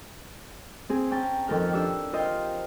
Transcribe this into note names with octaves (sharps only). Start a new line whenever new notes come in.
C4 G#4
C#4 G5 A5 A#5
F2 D#3 A4 A#4 G5 F6
D4 G4 E6
F4 A#4 C5 D#5 F5 G5